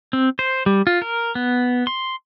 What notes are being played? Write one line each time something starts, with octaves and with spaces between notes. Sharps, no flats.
C4
C5
G3
F4
A#4
B3
C6